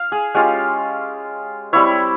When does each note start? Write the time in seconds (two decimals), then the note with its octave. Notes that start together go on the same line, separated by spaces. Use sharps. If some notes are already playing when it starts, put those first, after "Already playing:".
Already playing: F5
0.12 G#4
0.35 G#3 C#4 F4 G4
1.73 G3 C4 E4 C#5